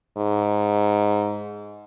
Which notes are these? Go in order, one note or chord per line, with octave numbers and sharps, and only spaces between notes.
G#2